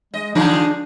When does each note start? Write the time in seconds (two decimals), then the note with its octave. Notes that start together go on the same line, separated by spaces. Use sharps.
0.14 G#3 D#5
0.35 D3 F3 G#3 D4